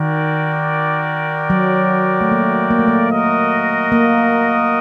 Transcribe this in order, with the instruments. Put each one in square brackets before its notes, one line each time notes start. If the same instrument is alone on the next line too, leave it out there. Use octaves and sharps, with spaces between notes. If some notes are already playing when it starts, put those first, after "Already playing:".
Already playing: [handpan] D#3 [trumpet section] F#4 A#4 D5 G5
[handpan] F#3
A3
A#3
A#3
A3
A#3
[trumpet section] F#4 A#4 D#5
[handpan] A#3